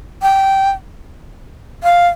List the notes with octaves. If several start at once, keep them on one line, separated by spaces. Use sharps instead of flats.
G5
F5